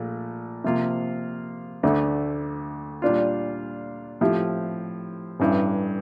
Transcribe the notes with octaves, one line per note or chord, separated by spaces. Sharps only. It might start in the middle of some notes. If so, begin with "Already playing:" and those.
Already playing: A#1 A#2 A3
C3 F3 A#3 F4
D2 D3 A3
A#2 G3 D4 F4
A2 F3 C4 E4 G4
A1 G2 E3